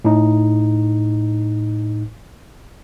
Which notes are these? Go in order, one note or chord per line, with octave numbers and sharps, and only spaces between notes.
A2 D#4